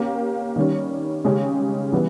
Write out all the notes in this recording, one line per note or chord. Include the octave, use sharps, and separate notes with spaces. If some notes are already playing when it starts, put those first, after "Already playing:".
Already playing: A#3 C#4 G4
D#3 G3 C#4
C#3 G#3 C#4 G4
E3 G3 B3